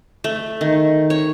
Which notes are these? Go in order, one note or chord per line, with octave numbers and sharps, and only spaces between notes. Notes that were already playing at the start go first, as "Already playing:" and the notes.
A3
D#3
C#5